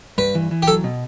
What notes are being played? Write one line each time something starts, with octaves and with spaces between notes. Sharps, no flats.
G2 B4
E3
E3
G4
F#3 A4
B2